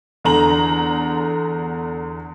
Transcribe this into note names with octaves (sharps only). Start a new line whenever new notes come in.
E2 D3 A#5 F#7